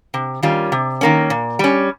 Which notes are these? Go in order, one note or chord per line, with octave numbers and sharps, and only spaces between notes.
C3
D#3 G3 C#4 F4
C3
D#3 A#3 C#4
A#2
G3 C#4